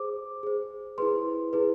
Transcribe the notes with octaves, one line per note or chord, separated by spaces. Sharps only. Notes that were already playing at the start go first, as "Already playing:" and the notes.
Already playing: G#4 C5 D6
G#4 C5
E4 G#4 B4 C6
E4 G#4 B4